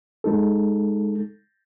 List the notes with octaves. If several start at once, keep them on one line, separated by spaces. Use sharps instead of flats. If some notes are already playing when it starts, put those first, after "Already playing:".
G#3 D#4 A4